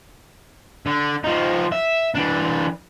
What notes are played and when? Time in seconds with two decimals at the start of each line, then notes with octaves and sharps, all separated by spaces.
0.86 D3
1.24 F3 D#4
1.72 E5
2.15 E3 D4